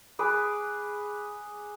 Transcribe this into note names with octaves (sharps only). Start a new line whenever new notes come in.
G#4 B4 B5 D6